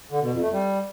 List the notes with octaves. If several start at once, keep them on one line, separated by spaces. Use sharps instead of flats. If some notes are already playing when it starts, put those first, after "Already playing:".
D3
B2
F2
A3
G3